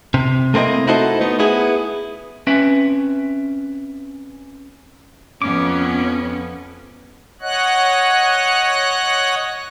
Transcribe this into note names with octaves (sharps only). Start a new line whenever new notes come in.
C3
A3 A#3 C4 E4 D#5
D#4 E4 F#4 A4 C5 D#5
A3 B3 D#4
B3 E4 G#4
C4 C#4 B4 E5 G5
F2 B3 C#4 D6
C#5 D#5 F#5 F#6